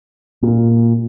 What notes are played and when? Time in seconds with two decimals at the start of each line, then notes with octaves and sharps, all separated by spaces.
0.43 A#2